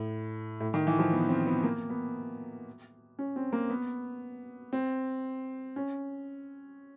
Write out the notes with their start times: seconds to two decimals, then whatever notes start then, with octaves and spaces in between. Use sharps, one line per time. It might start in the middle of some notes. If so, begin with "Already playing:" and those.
Already playing: A2
0.60 A2
0.74 D#3
0.87 E3
0.99 F3
1.13 B3
1.29 C4
1.46 B3
1.64 A#3
1.90 B3
3.19 C#4
3.36 C4
3.53 A#3
3.70 B3
4.73 C4
5.76 C#4